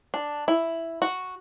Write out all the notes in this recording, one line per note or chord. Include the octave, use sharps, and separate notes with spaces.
D4
E4
F#4